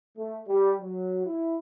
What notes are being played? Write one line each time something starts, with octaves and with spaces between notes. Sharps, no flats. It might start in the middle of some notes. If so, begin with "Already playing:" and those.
A3
G3
F#3
E4